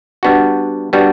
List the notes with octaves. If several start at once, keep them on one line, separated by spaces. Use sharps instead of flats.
G3 B3 D4 F#4
G3 B3 D4 F#4